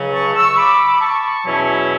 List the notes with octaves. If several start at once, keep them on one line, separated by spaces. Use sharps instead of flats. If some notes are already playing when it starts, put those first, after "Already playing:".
Already playing: C#2 C#3 F#3 C#4
A5 C#6
C#6 E6
B5 D6
A5 C#6
E2 B2 F#3 C#4 E4
C#5 E5